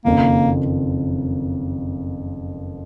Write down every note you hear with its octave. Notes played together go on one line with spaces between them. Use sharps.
F#1 F2 D#3 A#3